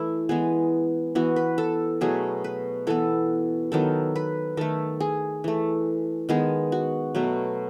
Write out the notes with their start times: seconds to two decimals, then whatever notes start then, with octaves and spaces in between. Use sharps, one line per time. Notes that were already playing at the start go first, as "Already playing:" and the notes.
Already playing: E3 A3 E4
0.29 E3 G#3 B3 G#4
1.15 E3 B3 F#4
1.36 B4
1.58 A4
2.01 B2 F#3 A3 G#4
2.44 B4
2.87 E3 B3 A4
3.72 D#3 F#3 B3 A4
4.16 B4
4.57 D#3 A3 A4
5.00 G#4
5.44 E3 A3
6.29 D#3 G#3 B3 G#4
6.72 F#4
7.15 B2 F#3 A3